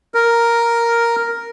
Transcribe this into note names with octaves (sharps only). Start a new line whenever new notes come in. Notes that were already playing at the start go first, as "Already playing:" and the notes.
A#4